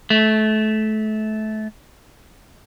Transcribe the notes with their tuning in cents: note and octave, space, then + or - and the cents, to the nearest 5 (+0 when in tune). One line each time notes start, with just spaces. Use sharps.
A3 -25